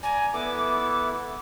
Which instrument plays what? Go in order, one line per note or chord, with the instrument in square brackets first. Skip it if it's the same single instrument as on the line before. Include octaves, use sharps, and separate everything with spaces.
[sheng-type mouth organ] D5 A#5 [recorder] G#5
[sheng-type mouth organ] B3 E4 A4 [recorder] D6